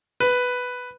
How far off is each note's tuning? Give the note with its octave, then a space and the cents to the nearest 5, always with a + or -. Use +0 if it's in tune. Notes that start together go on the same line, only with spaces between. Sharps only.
B4 +0